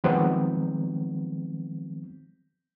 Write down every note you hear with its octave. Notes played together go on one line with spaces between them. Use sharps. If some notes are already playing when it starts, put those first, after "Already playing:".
D#3 F3 F#3 G#3 B3 C4